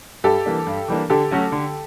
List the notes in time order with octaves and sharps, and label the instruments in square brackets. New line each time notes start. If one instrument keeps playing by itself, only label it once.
[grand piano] G2 [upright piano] G4 A4
[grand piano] E3 G3 A#3 D4
G2
E3 G3 A#3 D4
[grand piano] D3 [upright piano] G4 A4
[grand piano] F#3 A3 C#4 F#4
D3